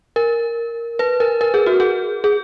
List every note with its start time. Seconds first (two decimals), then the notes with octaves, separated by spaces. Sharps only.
0.16 A#4
0.99 B4
1.20 A#4
1.41 A#4
1.54 G#4
1.67 F#4
1.80 G#4
2.24 G#4